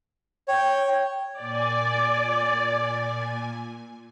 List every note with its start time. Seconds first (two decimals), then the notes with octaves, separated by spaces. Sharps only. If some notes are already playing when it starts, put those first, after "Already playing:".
0.48 C#5 G5
1.39 A#2 D5 G#5